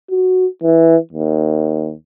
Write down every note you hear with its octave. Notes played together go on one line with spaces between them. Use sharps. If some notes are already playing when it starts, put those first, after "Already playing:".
F#4
E3
D#2